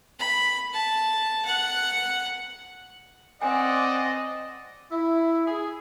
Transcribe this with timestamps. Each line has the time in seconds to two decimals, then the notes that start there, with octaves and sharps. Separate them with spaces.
0.19 B5
0.74 A5
1.45 F#5 F#6
3.42 C4 D5 D#5 F#5 G#5
4.90 E4
5.47 G#4